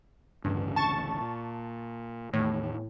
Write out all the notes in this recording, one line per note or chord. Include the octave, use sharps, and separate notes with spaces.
A1 D2 G2 C#3
A5 C#6 A6
A#2
E2 A2 D#3 A3